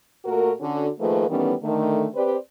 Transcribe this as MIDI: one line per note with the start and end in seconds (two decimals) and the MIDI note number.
0.25 0.52 46
0.25 0.52 57
0.25 0.52 66
0.25 0.52 70
0.60 0.88 50
0.60 0.88 61
0.60 0.88 66
0.99 1.26 51
0.99 1.26 53
0.99 1.26 57
0.99 1.26 58
0.99 1.26 68
0.99 1.26 71
1.29 1.53 45
1.29 1.53 51
1.29 1.53 52
1.29 1.53 55
1.29 1.53 59
1.29 1.53 61
1.63 2.06 50
1.63 2.06 51
1.63 2.06 57
2.15 2.37 60
2.15 2.37 67
2.15 2.37 71
2.15 2.37 72
2.15 2.37 74